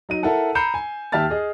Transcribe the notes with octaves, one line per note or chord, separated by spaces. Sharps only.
F#3 D#4 D#7
E4 A4 A#4 F#5 A5
A#5 B5 G6 C7 C#7 E7
G#5
D#2 G4 E5 A5 F6 A6
G#4 D#5